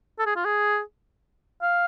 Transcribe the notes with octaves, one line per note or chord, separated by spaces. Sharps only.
A4
G#4
F4
G#4
F5